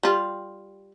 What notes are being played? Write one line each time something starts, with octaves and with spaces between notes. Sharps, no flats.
G3 F4